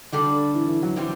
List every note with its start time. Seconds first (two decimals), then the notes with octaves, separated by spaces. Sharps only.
0.12 D3 G3 D4 F#4 A4
0.55 E3
0.69 E3
0.83 F#3
0.96 D3 E3 G3 C4